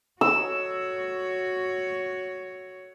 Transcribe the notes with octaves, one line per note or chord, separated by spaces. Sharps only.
F#4 C#5 E6